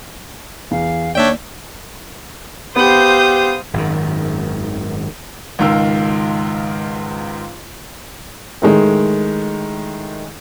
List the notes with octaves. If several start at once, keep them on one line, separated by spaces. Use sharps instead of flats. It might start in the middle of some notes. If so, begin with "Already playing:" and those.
E2 F5
D#2 D4 C#5 D5 E5 G5
B3 G4 C5 F5 D#6 G6
G#1 F#2 D#3
C#2 G#2 D#3 F5 E6
A2 D#3 G#3